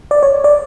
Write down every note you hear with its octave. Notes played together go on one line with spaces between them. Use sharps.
D5
C#5
D5